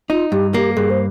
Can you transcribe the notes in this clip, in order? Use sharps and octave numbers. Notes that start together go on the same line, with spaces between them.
D#4 F4
G2 G4
A#3 G4
A#4
G2 G#4
C5